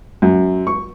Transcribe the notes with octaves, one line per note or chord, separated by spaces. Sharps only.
F#2
C#6